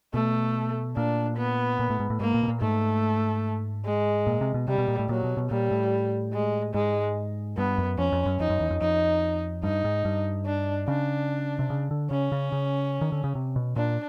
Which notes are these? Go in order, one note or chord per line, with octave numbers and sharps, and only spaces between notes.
B2 A3
A#2 D4
B3
A#2
A2
G#2
A2
G#2 A#3
A#2
B2
A#2
G#2 A3
G#3
A#2
C3
B2
C3 G3
B2
A#2
A2
A#2 F#3
B2
B2
A#2 G3
A2
G#3
G#2 G#3
G2 B3
F#2
F2 C#4
F2
F#2
F2 D#4
F#2
E2
F2
F2 D#4
G2 D#4
G#2
G2
D4
C#3 D4
C3
C#3
D3
C#3 C#4
C#3
C#3
D#3
D3
C#3
C3
B2
A#2 D4